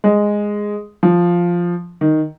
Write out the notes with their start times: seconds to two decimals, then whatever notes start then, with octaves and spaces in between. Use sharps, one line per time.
0.04 G#3
1.03 F3
2.01 D#3